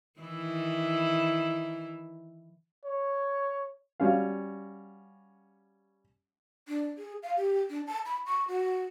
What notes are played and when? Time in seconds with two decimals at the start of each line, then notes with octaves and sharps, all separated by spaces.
0.20 D#3 E3 E4
2.85 C#5
4.00 G3 C#4 F#4 F5
6.68 D4
6.98 G#4
7.23 F5
7.37 G4
7.70 D4
7.87 A5
8.05 B5
8.26 C#6
8.48 F#4